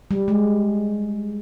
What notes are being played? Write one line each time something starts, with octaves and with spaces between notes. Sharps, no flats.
G3
G#3